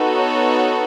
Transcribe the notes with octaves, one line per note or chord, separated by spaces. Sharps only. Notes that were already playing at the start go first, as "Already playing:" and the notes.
Already playing: B3 D#4 F#4 A4
C#5